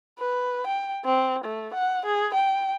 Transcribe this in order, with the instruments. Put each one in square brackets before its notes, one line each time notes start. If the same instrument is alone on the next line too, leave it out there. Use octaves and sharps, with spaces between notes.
[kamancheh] B4
G5
C4
A3
F#5
G#4
G5